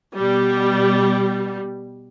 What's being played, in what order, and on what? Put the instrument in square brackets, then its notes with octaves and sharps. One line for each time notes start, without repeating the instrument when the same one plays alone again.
[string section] B2 G3